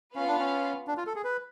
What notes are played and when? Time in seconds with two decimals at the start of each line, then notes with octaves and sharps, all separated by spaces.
0.15 B3 C#4 F4 B4 F5
0.28 D4
0.39 C#4
0.88 D4
0.97 F4
1.07 A4
1.16 G#4
1.24 B4